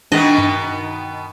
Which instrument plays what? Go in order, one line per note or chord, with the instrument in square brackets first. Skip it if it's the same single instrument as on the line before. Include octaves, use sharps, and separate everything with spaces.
[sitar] B2 D#3 B3 [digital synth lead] D4 [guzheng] D#5
[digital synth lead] G2